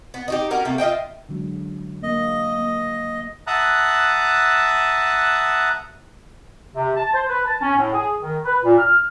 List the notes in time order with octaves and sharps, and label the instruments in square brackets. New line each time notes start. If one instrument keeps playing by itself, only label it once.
[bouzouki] B3
D#4 F#4 G4
C#4 F#4 G4 A#4
C3 A3 A#3
F4 D#5 E5 G5
[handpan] D3 F#3 G#3
[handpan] A#3 [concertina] D#5
[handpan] A#3
[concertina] E5 F#5 A5 A#5 D#6 F#6
[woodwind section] C3
A5
C5
B4
A5
C#4
A2
G#4
D#3
B4
A#2
F6